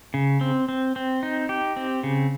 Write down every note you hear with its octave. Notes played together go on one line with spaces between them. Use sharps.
C#3
C4
C4
C4
D#4
G4
C4
C#3